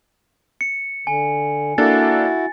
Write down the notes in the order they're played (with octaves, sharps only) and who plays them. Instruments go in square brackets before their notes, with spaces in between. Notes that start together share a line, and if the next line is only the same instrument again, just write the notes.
[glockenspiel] C#7
[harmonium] D3 [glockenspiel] G#5
[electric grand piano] A#3 D4 A4 [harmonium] E4 F#4 [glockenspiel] A6